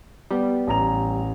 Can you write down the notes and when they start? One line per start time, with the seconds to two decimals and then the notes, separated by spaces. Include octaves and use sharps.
0.31 G3 B3
0.67 A1 A#5 F7